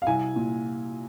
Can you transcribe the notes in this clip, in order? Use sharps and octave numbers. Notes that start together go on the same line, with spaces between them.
F5
C2 G#5
A#2